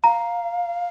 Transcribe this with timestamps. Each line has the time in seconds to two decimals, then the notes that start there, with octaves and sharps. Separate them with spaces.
0.04 F5 A#5